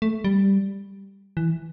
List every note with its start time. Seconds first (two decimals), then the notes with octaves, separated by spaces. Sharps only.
0.02 A3
0.24 G3
1.37 E3